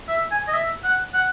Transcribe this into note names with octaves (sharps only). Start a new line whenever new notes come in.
E5
G#5
D#5
E5
F#5
F#5